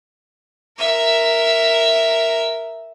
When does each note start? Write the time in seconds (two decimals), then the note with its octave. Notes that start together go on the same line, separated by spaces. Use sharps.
0.78 A#4 E5